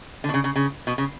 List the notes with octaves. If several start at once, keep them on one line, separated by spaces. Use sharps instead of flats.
D3
B2
C#3
C#3
C#3
B2
C#3